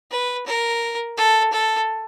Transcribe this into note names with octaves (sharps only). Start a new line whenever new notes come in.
B4
A#4
A4
A4